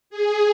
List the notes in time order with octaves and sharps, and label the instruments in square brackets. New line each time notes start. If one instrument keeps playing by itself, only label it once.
[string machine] G#4